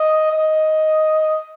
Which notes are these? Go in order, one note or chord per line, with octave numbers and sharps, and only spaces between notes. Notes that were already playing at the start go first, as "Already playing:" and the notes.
Already playing: D#5
D#5